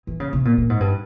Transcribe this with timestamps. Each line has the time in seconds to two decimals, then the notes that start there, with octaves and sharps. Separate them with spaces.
0.07 E3
0.20 C#3
0.33 C3
0.45 A#2
0.58 A#2
0.70 G#2
0.80 G2